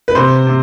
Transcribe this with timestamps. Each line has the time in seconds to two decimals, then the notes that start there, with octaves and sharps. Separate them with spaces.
0.08 B4
0.15 C3 C5
0.47 C3